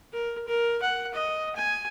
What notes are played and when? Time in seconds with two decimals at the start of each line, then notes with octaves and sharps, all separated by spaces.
0.13 A#4
0.47 A#4
0.82 F#5
1.14 D#5
1.56 G#5